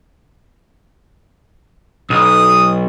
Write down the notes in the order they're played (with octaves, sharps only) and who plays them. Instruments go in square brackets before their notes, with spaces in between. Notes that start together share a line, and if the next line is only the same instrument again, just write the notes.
[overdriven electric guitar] B1 [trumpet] D#6